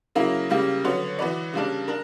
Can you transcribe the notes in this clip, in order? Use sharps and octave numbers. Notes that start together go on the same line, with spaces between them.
C#3 F#3 A#3 E4 A#4
C#3 G3 A#3
D3 F#3 B3 F#4 C#5
E3 B3 F#4 B4 D5
C#3 G3 A#3 D4
D4 A#4